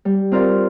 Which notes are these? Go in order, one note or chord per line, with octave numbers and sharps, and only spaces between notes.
G3
C4 F4 A#4 D5